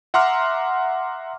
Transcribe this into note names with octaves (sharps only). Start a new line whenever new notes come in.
E5 F#5 A#5 C6 D6 F6